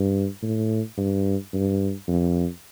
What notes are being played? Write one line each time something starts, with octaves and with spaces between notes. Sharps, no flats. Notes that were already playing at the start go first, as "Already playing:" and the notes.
Already playing: G2
A2
G2
G2
F2